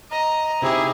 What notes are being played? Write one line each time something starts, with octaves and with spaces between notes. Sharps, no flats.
D#5 A#5
C3 D#4 E4 G4 G#4 C5